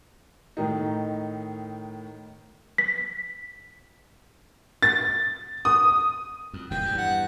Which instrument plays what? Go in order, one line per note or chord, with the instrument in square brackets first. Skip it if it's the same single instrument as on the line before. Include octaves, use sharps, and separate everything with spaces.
[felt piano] A2 D#3 D#4
[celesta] B6
[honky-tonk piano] A6
D#6
[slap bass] F2
[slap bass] D#1 D#2 B2 [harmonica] G5
[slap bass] E2 G2
[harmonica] F#5